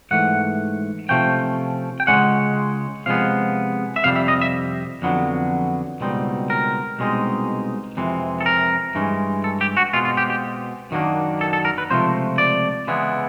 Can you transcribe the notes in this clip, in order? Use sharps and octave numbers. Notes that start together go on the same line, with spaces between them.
G#2 E3 A3 F#5
C3 F3 A3 C#4 G5
G5
C#2 B2 G#3 C#4 F#5
C3 F3 G#3 B3 F5
E5
F2 C3 G3 F5
E5
D#5
E5
F2 D3 F#3 B3
C#2 B2 G3 C4 D#4
A#4
C2 B2 G#3 C4 D#4
F2 C3 E3 G#3
A4
A#4
G2 E3 G#3 C#4
A4
G4
F#4
B2 G#3 C4 F4
F4
G4
G4
F#2 D#3 F#3 A#3 D4
A4
A4
A#4
B4
C#2 C3 F3 A3 C5
D5
C#3 E3 G#3 B3 E4